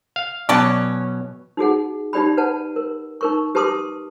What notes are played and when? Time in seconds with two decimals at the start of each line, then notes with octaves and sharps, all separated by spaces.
0.16 F5
0.49 B2 F#3 C#4 D5 A5
1.57 D#4 F#4 G#4 F#5
2.13 D#4 G4 D5 G5 B5
2.37 B4 F#5 A5
2.76 A#4
3.21 D#4 A#4 C#6
3.55 G4 B4 A5 C6 D6 D#6